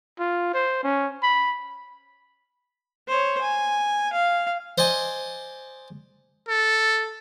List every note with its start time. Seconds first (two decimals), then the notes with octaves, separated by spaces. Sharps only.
0.19 F4
0.54 C5
0.84 C#4
1.23 B5
3.08 C5 C#5
3.41 G#5
4.13 F5
4.78 C5 D5 D#5 G#5
6.48 A4